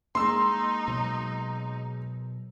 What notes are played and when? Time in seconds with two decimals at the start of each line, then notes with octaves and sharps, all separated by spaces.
0.15 G#3 A#3 D#4 C6 E6
0.88 B2 F#3